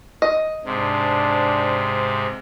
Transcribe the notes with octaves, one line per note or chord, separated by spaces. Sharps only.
D#5
G#2 C3 D4